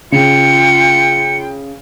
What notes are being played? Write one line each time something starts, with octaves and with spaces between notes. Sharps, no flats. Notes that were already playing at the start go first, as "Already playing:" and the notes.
C#3 F4 G5 C#7